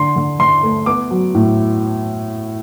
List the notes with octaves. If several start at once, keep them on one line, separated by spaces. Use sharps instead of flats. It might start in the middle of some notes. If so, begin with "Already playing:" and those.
Already playing: D3 C6
D3
D3 C6
A3
B3 D6
F#3
A2